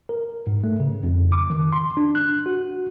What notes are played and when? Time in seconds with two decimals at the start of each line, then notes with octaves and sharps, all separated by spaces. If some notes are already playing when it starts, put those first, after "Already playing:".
0.09 A#4
0.47 G#2
0.64 A3
0.80 C#3
1.03 F2
1.32 D6
1.50 D#3
1.73 C6
1.97 D4
2.15 F#6
2.46 F#4